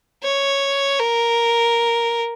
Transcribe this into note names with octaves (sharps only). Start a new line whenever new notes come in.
C#5
A#4